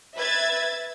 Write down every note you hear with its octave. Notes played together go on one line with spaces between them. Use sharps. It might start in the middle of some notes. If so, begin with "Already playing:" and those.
B4 E5 G#6 A6